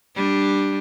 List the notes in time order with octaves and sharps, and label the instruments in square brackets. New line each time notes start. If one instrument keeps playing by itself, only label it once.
[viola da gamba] G3 D4